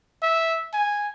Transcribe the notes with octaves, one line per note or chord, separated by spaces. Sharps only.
E5
G#5